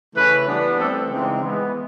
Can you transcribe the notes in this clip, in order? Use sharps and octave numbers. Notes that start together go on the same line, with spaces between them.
C#3 E3 A3 C#4 B4
E3 G3 B3 D4
E3 A3 C4 A4
C#3 E3 G#3 C4 D#4
E3 G#3 B3